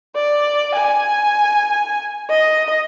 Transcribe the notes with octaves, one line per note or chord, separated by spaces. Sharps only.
D5
G#5
D#5